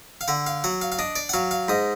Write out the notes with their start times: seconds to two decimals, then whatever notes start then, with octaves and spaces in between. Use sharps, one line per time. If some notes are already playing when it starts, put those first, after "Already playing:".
0.21 F5
0.28 D3 F#5
0.46 F5
0.64 F#3 F#5
0.81 F5
0.92 F5
0.99 D4 D#5
1.16 D5
1.29 F#5
1.33 F#3 F5
1.51 F5
1.68 G#2 D#5